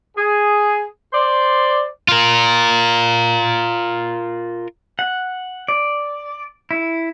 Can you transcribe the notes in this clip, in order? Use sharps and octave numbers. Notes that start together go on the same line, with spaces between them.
G#4
C5 D5
F4 A#4
F#5
D5
E4